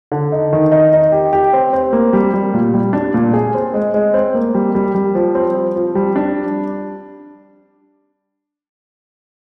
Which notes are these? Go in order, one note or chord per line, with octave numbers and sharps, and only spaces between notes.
D3
D#4
D#3
D#4
D#4
G4
G4
C4
C4
A#3
G3
G3
A#2
G3
D4
A#2
G#4
C4
G#3
G#3
C4
A#3
G3
G3
G3
F3
C4
F3
F3
G3
D4